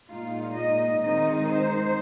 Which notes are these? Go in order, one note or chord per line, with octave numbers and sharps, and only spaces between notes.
A#2 G#3 D#4 F4
D#5
D#3 G#3 C4 D#4 D#5
C5